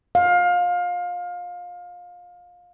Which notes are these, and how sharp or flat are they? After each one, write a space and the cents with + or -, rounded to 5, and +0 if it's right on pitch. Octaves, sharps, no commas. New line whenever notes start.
F5 +25